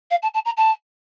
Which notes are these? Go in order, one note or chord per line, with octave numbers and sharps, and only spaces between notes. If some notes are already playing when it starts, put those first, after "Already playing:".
F5
A5
A5
A#5
A5